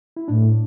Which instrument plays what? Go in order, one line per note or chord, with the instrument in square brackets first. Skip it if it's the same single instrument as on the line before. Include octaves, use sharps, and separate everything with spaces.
[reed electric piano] E4
[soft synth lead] A2 [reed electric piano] D4